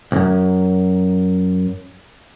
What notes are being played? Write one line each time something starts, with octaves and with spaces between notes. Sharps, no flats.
C2 F#2